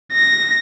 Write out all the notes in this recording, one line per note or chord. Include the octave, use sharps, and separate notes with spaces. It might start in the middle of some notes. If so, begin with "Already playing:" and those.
A#6